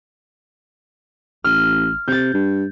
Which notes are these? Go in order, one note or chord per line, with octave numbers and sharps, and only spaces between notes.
A1 F6
C3 G6 A6
G2